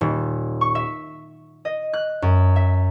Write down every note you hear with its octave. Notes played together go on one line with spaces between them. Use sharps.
D#1
C#6
E5
D#5
F#6
F#2
E5